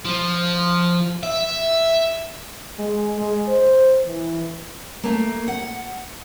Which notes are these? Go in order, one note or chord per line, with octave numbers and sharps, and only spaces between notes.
F3
E5
G#3
G#3
C5
E3
A3 A#3
F#5